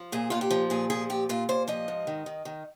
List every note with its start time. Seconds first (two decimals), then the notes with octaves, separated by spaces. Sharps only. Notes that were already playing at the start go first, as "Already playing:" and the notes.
Already playing: F3
0.12 A#2 G#4
0.30 A#2 F4
0.41 G4
0.51 F3
0.70 A#2 G#4
0.90 F3 G#4
1.10 A#2 G4
1.29 A#2 F4
1.49 A#2 C5
1.68 F3 D#5
1.88 G#2
2.07 D#3
2.26 D#3
2.45 D#3